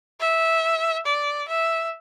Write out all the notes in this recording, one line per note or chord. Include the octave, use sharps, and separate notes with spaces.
E5
D5
E5